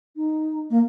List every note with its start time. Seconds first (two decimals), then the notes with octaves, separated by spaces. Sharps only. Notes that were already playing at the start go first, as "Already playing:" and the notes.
0.16 D#4
0.70 A#3